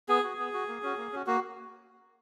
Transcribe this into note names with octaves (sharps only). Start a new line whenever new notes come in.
B3 G#4
F#4
B3
F#4
A#3
C#4 F#4
A#3
C#4 F#4
A#3 F#4